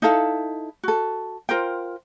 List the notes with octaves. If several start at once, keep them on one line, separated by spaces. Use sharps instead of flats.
D#4 E4 A4 F5
F#4 A4
F4 A#4 C5 G5